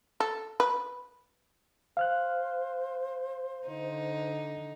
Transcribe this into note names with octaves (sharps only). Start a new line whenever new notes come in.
A4
B4
C5 F5 F6 F#6
D3 D#4